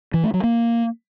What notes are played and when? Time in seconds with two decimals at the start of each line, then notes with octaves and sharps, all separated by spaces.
0.14 E3
0.24 A3
0.34 F#3
0.44 A#3